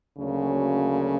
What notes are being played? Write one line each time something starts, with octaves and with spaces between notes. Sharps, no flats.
D2 C#3 F#3 A#3 C#4